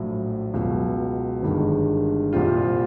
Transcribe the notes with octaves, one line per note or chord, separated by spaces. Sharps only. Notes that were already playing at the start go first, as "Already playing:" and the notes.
Already playing: A#1 A2 F#3
C#2 B2 F#3
G1 G2 D#3 G#3
C2 A#2 G3 C4 F4